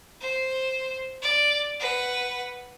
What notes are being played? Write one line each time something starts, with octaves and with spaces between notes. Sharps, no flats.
C5
D5
B4 F#5